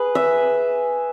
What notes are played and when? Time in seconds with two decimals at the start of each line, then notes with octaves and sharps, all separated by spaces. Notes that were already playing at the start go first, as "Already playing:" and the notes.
Already playing: G#4 B4
0.15 E5